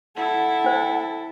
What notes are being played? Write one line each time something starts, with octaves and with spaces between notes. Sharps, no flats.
E4 A4 F#5
D4 C5